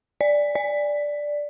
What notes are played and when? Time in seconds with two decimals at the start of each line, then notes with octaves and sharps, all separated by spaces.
0.21 D5
0.55 D5